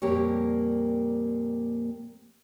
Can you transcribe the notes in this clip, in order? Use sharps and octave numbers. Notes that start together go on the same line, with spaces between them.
F2 A#2 G3 A#3 G4 C#5